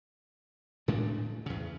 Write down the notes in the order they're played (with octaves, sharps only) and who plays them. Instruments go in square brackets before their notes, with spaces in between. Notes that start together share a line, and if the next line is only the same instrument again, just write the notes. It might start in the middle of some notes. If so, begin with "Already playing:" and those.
[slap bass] A2 G#3 A3 D4
E2 C#3